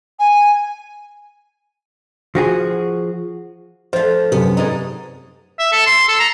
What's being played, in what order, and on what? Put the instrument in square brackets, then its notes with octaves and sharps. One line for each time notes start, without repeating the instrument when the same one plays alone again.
[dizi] G#5
[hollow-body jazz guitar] F3 F#4 G#4
[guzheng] F3 A3 [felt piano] C5
[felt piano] F#2 C3 [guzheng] B3
[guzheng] G#2 D#4
[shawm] E5
A4
C6
A4
A#5